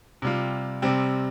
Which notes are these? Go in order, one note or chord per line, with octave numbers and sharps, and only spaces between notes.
C3 G3 F4
C3 G3 C4